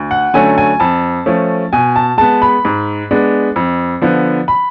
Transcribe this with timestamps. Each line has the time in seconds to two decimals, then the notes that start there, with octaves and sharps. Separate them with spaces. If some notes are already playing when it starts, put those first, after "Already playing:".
Already playing: D2
0.11 F#5
0.34 D3 F#3 A3 C#4 G#5
0.58 G#5
0.80 F2 A5
1.26 F3 A3 C#4
1.73 B2 G#5
1.96 A5
2.18 G#3 B3 A5
2.42 B5
2.65 G#2
3.11 G#3 B3 D4
3.56 F2
4.02 D3 F3 B3
4.48 B5